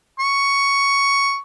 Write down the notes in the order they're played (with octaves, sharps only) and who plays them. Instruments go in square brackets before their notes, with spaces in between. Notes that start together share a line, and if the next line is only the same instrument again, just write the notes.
[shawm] C#6